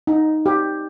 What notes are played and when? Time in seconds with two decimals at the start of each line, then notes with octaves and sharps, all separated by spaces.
0.07 D#4
0.46 G4